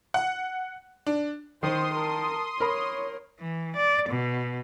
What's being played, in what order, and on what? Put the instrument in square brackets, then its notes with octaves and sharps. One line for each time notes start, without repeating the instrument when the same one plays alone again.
[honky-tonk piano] F#5
D4
[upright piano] D#3 [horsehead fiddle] C5 [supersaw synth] C6 D#6
[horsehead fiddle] A#4 A5
[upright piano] A#4 B5 [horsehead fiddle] C#5
[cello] E3
D5
B2